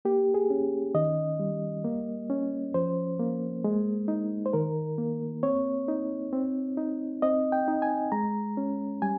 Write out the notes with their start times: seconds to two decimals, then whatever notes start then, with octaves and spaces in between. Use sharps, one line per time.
0.05 A#3 G4
0.34 G#4
0.50 C#4
0.95 D#3 D#5
1.39 G3
1.85 A#3
2.30 C#4
2.74 F3 C5
3.20 A#3
3.64 G#3
4.08 D#4
4.46 C5
4.53 D#3 A#4
4.98 A#3
5.43 C4 C#5
5.88 D#4
6.33 C4
6.77 D#4
7.22 C4 D#5
7.52 G5
7.68 D#4
7.82 G#5
8.12 G#3 A#5
8.57 C#4
9.02 G3 G#5